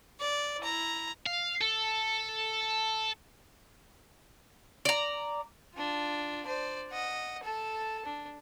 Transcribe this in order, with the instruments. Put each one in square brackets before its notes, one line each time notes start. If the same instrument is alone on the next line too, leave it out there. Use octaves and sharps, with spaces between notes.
[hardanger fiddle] D5
E4 A#5
[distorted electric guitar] F5
A4
[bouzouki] D5 A#5
[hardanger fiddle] D4 F4
C5 D5
D#5 F#5
A4 A5
D4